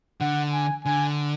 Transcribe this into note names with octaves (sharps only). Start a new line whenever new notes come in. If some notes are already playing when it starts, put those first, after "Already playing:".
D3 F#5
G#5
D3 G#5